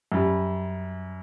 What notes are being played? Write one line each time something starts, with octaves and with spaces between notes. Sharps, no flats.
F#2 G3